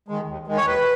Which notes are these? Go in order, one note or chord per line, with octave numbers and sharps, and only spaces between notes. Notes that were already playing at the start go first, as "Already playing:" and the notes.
D#3 G#3
D#2
D#3 G#3
C#5
D#2 B4